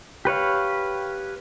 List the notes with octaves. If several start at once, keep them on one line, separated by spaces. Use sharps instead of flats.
G4 B4 C#5 F5